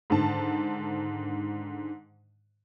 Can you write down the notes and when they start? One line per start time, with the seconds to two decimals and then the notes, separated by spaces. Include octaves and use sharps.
0.10 G#2 D3 D#3 A5